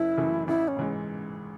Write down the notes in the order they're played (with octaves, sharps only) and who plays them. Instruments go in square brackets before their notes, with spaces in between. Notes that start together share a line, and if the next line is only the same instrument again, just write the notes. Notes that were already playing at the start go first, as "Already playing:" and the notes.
Already playing: [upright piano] F#1 [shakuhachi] E4
[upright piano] F#2 C#3 E3 A3
[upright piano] A1 [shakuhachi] E4
[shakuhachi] C#4
[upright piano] G#2 E3 G#3